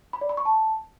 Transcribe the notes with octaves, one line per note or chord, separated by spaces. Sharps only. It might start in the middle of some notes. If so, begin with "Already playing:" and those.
B5
D5
B5
C#6
A5